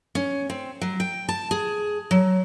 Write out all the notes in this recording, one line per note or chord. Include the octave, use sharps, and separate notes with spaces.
C#4
C4
F#3
G5
A5
G#4
F#3